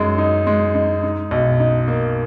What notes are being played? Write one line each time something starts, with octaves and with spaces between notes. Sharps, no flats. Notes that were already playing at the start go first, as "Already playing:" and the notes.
Already playing: F#2 G#3 D#4
D#4
G#3
D#4
D#4
B1
D#4
A#3